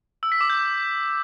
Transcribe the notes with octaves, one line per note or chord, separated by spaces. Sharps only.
E6
B6
D6
G6